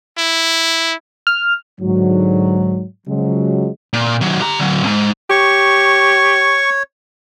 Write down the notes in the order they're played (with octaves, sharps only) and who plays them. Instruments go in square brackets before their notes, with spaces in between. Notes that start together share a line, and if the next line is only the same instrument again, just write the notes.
[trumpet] E4
[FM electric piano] F6
[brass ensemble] G#2 D3 F#3
C#3 F3 F#3 G#3
[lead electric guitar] A#2
D#3 F#3
G4 A#5
D3 F#3
F2 G#2
[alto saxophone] G4 [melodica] C#5 [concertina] C#6